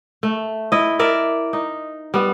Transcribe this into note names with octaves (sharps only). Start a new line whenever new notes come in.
A3
E4 D#5
A#4 D5 E5
D#4
G3 B3